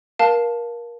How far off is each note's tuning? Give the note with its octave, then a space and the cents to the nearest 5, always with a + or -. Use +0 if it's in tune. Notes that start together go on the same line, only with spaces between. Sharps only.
A#4 +25 F5 +0 A5 +0